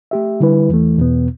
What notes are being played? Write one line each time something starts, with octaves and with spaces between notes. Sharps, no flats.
A3 G4 E5
D3 G3 E4 B4
E2 E3 A3
E2 B2 B3